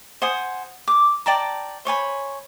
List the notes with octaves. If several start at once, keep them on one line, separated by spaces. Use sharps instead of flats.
C5 F#5 G#5 D#6
D6
D5 G5 A5 A#5
C5 C#5 G#5 B5